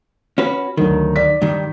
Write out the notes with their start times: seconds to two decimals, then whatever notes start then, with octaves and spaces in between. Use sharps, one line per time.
0.38 C#4 F#4 B4
0.77 D2 D#3 F#3 A#4
1.16 D5 B6
1.42 G2 D#3